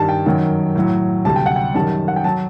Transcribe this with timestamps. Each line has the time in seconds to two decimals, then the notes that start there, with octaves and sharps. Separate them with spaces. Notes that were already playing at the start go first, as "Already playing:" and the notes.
Already playing: G2 D#3 G3 A5
0.09 G5
0.26 F#2 D#3 F#3
0.76 A2 F#3
1.25 D2 C3 G3 A5
1.36 G5
1.46 F#5
1.56 G5
1.74 F#2 D#3 G3 A5
2.08 F#5
2.16 G5
2.24 F#3 A5